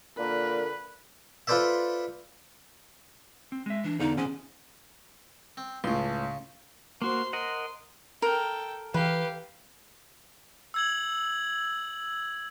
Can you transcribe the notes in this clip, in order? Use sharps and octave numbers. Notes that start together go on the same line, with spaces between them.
A#2 D3 A#4 B4
F4 A4 B4 C5 D5 E5
C4
G#3 E5
E3 D4
E2 D3 D#4 F5
C#4 G#4 C5 F#5
C4
C#2 A2 C#3 C6
A#3 F#4 C5 C6
A#4 D#5 F#5 C6
A4 A#4 G5
E3 G4 B4 F5
E6 G#6 F#7